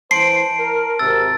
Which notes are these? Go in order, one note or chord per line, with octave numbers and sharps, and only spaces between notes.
E3 C5 A5 C6 C7 D7
A#4
G#1 C3 A#4 E6 A6